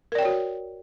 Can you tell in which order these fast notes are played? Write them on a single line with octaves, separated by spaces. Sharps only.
A#4 D5 G5 C#5 F#4